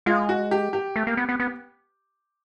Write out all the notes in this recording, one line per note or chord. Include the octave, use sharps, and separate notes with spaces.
G#3 F4
F#4
G4
G4
A3
A#3
B3
B3
B3